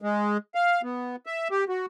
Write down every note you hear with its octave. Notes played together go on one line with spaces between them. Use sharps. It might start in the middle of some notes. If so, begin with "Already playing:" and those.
G#3
F5
B3
E5
G4
F#4